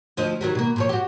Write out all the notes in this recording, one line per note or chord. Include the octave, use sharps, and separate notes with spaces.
D2 F3 D#5
D#3 F#3 G3
B2 A#3
A#2 F3 C#5
F#4 G4